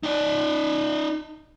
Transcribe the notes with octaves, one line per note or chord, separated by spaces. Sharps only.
D#4 D5